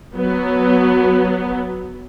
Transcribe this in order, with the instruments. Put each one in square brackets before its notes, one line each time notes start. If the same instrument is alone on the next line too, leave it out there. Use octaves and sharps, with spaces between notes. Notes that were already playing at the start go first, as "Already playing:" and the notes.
[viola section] F#3 B3